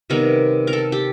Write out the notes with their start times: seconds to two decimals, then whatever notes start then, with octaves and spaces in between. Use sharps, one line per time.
0.10 C3 D#3 G3 B3 A#4
0.67 A#4
0.73 A4
0.92 G4